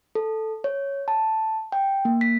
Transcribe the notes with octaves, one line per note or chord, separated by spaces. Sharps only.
A4
C#5
A5
G5
A#3
B6